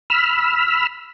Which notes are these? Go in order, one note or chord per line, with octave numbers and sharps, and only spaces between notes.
B5 E6 F6